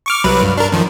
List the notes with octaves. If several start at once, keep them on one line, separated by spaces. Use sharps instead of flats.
C#6 D6 F6
C2 F#3 B4
G2
D4 A#4
F#2 D#3 F3